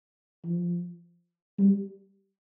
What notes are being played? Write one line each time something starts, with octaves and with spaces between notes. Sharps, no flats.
F3
G3